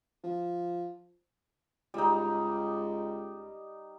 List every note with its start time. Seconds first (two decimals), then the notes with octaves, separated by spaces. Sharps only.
0.24 F3
1.94 C#2 G3 D#4